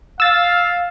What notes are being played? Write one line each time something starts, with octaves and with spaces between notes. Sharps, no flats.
F5 E6 A6